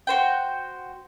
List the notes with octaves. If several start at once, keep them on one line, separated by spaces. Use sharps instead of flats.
F#4 C5 G5